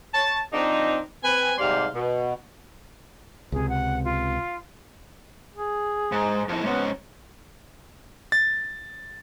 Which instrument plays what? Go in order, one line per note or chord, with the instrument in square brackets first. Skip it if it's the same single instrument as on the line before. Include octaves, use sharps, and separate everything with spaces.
[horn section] C#5 A5
F3 C4 D4 D#4
C4 B4 G#5
G#2 C3 G3 D5 F5 C6
B2
[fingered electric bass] C#2 C3 [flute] G#4
[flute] F#5
F4
[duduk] G#4
[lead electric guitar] G#2
F2 E4
[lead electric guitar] G#2 C#4 [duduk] B3
[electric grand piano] A6